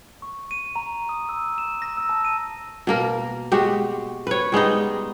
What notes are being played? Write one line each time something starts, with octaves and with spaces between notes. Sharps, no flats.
C#6
D#7
A#5
D#6
E6
E7
A#6
E6
A5
D#7
B2 A#3 A#4
G#3 F#4 G4
B4 C#5
G3 G#3 B3 D#4